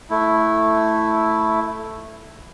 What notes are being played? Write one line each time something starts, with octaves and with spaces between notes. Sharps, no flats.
A3 E4